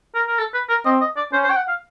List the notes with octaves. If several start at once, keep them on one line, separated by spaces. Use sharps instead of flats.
A#4
A#4
A4
B4
A#4
C4 D#5
D#5
D5
C#4 C5
C5
G5
F#5
F5